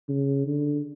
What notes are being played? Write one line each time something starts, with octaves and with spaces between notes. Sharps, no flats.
C#3
D3